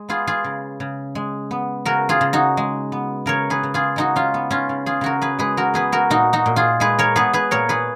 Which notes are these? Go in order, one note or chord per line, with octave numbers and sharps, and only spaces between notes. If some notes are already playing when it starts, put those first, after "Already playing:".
Already playing: G#3
B3 F4 G#4
F4 G#4
C#3
C#3
G#3
B3
C#3 F#4 A#4
F4 G#4
C#3
D#4 F#4
G#3
B3
C#3 A#4 C#5
G#4 B4
C#3
F4 G#4
G#3 D#4 F#4
C#4 F4
B3
C#4 F4
C#3
F4 G#4
C#3 F#4 A#4
G#4 B4
G#3 G#4 B4
F#4 A#4
B3 G#4 B4
F#4 A#4
A#2 D#4 F#4
D#4 F#4
A#2
F4 G#4
G#3 G#4 B4
A#4 C#5
B3 G#4 B4
G#4 B4
A#2 A#4 C#5
G#4 B4